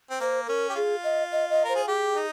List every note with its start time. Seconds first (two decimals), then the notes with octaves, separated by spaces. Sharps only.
0.10 C4
0.20 A#3 C5
0.47 C#4 A#4
0.69 G4
0.76 F4 G#4
1.04 D#5
1.32 D#5
1.50 D#5
1.64 A#4 C5
1.75 G#4
1.87 G4 G#4
2.15 D#4